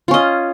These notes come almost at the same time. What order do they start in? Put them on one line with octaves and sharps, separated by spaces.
F4 C#4 D#5